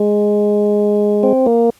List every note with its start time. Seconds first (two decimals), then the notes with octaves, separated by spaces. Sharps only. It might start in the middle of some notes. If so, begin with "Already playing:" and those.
Already playing: G#3
1.23 C4
1.46 A#3